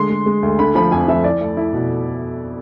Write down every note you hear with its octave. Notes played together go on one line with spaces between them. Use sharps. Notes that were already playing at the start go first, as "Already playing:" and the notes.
Already playing: D3 G#3 C6
G#3
G#3
D2
D3 B5
F3 B5
F2 G#5
F3 E5
E4 D5
A3
E4
B2